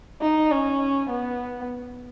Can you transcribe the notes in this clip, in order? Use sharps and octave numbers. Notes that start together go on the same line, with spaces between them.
D#4
C#4
B3